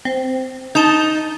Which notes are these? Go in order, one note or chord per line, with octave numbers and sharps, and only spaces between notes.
C4
D#4 A5 G6